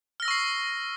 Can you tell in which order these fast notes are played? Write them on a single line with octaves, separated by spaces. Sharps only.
F6 A#6 E6 C#6 C7